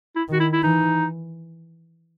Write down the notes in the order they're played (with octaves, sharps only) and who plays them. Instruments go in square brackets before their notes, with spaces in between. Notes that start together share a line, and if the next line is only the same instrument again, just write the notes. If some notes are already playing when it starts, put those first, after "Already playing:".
[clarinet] E4
[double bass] D#3 [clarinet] F#4
[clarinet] E4
E4
[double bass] E3 [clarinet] D#4